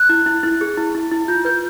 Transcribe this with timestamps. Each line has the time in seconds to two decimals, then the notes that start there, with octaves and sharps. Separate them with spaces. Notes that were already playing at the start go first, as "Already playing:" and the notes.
Already playing: F#6
0.09 E4
0.26 E4
0.43 E4
0.61 G#4
0.78 E4
0.95 E4
1.11 E4
1.28 F4 G6
1.45 B4 G6